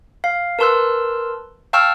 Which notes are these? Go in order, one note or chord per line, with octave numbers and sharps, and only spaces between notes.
F5
A#4 B4 A5 C6 E6 F#6
F5 G5 A5 C#6 E6 F6